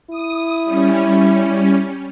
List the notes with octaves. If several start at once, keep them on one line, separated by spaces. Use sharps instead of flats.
E4 D#6
G3 C#4